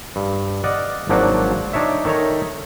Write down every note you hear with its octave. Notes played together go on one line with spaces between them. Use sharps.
G2
D5 D#5 F5 F#5
G#1 F3 F#3 A#3 D4 F#5
D4 D#4 C#5 E5
D#3 A4 C#5 E5 A#5